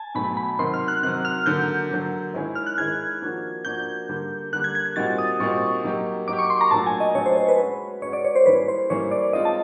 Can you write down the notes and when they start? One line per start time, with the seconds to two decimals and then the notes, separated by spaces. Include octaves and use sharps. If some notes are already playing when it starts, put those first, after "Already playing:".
Already playing: G#5 A5
0.15 B2 F#3 A3 B5
0.37 B5
0.59 C3 D#3 F#3 C6
0.74 F6
0.88 F#6
1.03 C3 D#3 F#3 F#6
1.25 F6
1.46 D3 F#3 A#3 G6
1.91 D3 F#3 A#3
2.34 D#3 G#3 C#4 E4 G#4
2.55 F6
2.66 F#6
2.77 D#3 G#3 C#4 E4 G#4 G#6
3.21 F3 A#3 D4 F#4
3.65 F3 A#3 D4 F#4 G6
4.09 D3 G3 A#3
4.53 D3 G3 A#3 F#6
4.64 G#6
4.75 G#6
4.86 G#6
4.96 A#2 G3 C4 D#4 F#4 A6
5.18 D#6
5.40 A#2 G3 C4 D#4 F#4 C#6
5.84 F#3 A#3 D#4 G4
6.28 F#3 A#3 D#4 G4 D6
6.39 C#6
6.50 C6
6.61 A#5
6.71 A#2 F#3 A3 D4 A5
6.87 G#5
7.00 D#5
7.15 A#2 F#3 A3 D4 C#5
7.26 C5
7.37 C5
7.48 B4
7.58 G#3 C#4 F#4
8.02 G#3 C#4 F#4 C#5
8.13 D5
8.25 C#5
8.35 C5
8.46 E3 G3 A#3 C#4 E4 B4
8.68 C5
8.90 E3 G3 A#3 C#4 E4 C#5
9.11 D5
9.33 G#3 C4 F4 D#5
9.45 A5